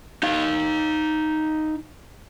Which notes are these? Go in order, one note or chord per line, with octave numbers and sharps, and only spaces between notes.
D#4 F5